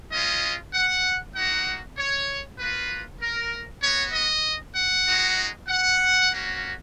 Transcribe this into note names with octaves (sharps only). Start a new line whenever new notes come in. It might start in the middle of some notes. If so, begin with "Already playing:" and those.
G#3 C#4 F4 D#5
F#5
A#3 D#4 F#4 F#5
C#5
A#3 F4 B4
A#4
B3 F#4 C#5
D#5
F#5
G#3 D#4 F#4
F#5
A#3 C#4 F#4